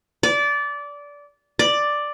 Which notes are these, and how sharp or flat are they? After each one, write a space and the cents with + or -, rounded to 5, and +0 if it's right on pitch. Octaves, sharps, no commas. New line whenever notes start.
D5 -20
D5 +5